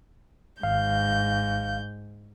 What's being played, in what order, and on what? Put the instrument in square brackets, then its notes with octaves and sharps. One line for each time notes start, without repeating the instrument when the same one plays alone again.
[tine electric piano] G#1 F5 [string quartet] G#2 G6